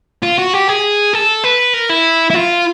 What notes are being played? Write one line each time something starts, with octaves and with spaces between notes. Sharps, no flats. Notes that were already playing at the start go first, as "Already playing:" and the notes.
F4
F#4
G4
G#4
A4
B4
A#4
E4
E4
F4